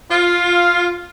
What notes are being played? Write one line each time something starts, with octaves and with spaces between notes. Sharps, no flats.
F4